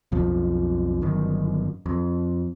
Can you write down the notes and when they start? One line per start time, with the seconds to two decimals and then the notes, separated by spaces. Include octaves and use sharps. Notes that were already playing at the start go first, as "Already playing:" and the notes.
0.12 B1 F2 F3
1.01 G1 F#2 D#3
1.86 F2